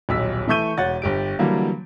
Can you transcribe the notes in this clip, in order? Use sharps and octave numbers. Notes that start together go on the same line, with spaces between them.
D#1 B1 E6 B6
E3 A3 E5 C#6 G6 D#7
E1 C#5 F#5 A6
G1 G4 D7
D3 E3 F#3 G3 A#3